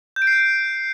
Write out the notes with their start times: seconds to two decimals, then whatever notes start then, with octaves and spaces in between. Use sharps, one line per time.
0.16 G6
0.22 D7
0.27 C7
0.33 D7